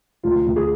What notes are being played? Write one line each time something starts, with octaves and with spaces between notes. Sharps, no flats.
D2 F4
D2
G#4